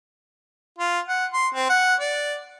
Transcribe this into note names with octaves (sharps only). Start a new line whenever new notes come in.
F4
F#5
C6
C4
F#5
D5